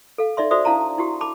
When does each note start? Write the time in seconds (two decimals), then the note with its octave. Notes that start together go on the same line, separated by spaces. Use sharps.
0.18 A4 F5
0.37 D#4 D5 E5 C6
0.51 F#4 C5 D5 E5 D#6
0.64 D4 E4 F5 A5 A#5 C6
0.98 E4 F#4 G4
1.21 A5 B5 D6